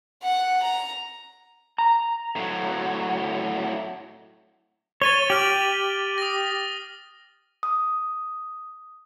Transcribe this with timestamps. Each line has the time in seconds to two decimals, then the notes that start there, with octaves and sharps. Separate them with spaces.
0.22 F#5
0.63 A#5
1.78 A#5
2.36 A2 F#3
5.02 C#5 A6 D#7 G7
5.30 G4 F6 F#7
6.18 D#6 A#6
7.63 D#6